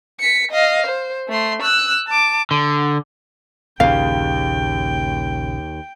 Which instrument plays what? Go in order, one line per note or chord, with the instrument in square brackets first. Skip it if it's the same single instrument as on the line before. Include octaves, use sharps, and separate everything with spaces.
[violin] B6 C#7
D#5 F5
C5
A3 C6
E6 F#6
A5 D6
[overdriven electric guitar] D3
[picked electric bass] A#1 C#3 [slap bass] D#2 [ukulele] F5 [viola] G5